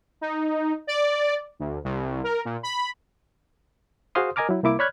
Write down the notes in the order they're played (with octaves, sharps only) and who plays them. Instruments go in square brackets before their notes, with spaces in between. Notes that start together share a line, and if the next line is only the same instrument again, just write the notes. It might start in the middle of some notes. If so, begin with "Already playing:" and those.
[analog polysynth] D#4
D5
D2
C2
A#4
A#2
B5
[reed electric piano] F#4 G#4 C5 F5 C6 D#6
A#4 D#5 G#5 A#5 D6 F6
F#3 E4
C2 A#3 E4 D6
C#5 D5 B5 F6 F#6 G#6